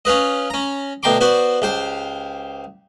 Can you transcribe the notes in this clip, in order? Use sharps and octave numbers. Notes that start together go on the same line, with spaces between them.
C#4 F4 B4 D#5
C#4 A#5
D2 B2 G5 A#5 C6 D6
B3 F#4 C5 D5
C#2 G4 C5